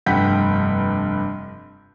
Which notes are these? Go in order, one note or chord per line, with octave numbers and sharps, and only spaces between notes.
F1 G2 F#5 G5 G6 B6